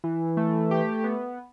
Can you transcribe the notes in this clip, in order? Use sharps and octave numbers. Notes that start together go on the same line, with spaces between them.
E3
A3
G4
B3